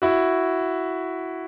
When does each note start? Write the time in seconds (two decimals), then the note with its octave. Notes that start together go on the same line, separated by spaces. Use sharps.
0.02 E4 F#4